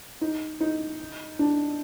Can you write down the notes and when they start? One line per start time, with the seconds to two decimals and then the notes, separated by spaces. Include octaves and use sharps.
0.21 D#4
0.60 D#4
1.39 D4